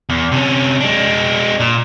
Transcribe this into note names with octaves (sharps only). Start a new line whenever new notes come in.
E2
C3 C#4
G#3 D4
A#2